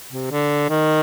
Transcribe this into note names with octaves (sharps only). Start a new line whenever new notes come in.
C3
D3
D#3